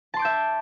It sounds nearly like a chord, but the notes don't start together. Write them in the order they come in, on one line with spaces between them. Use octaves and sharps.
A5 C6 D6 G6 E5